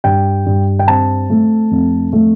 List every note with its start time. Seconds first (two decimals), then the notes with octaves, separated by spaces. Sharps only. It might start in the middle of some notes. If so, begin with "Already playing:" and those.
0.04 G2 G5
0.46 G2
0.79 G5
0.87 C4 A5
1.30 A3
1.71 F2
2.13 A3